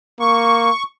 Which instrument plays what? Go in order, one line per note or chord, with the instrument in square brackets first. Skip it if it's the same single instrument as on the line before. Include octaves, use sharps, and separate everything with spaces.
[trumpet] A#3 [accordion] C#6